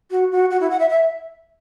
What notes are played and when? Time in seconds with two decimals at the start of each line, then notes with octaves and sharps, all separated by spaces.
0.11 F#4
0.31 F#4
0.50 F#4
0.60 E4
0.70 F#5
0.79 E5
0.89 E5